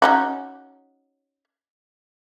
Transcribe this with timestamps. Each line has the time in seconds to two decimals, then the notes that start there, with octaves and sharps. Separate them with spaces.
0.02 C#4 D#4 F#4